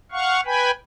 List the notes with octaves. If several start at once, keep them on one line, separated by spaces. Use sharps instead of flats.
F5 F#5 C#6
B4 G5 G#5 B5